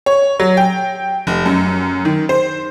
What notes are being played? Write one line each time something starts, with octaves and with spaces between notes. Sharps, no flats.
C#5
F#3
G5
F1
F#2
D#3
C5